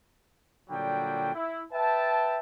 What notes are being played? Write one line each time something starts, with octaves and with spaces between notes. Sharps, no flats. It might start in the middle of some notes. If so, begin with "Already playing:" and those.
A#2 D3 F#3 G3 G5
E4
B4 E5 G5 A5